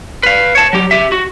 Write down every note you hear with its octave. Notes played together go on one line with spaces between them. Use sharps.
B4 F5
C#5 A5
F#3 G4
G4 E5
F#4